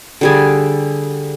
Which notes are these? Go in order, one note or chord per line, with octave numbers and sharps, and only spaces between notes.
D3 G3 G#4